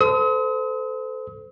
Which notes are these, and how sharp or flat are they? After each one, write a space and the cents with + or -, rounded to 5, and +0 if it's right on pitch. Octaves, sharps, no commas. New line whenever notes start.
A4 +0 C5 -30 D#6 +45